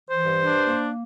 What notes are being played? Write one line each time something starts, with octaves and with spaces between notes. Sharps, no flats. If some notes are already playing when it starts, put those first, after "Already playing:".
E3 C5
G2
D4
A#3